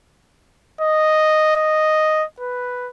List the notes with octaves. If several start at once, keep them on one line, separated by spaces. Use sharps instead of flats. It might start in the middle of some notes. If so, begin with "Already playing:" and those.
D#5
D#5
B4